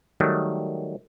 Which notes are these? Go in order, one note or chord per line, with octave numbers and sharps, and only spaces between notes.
D#3 F#3 G3 A3